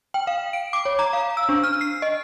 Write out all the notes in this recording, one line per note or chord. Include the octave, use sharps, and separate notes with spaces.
G5
F5
D7
D6
C#5
A#5
F5
E6
D4
F6
C7
D#5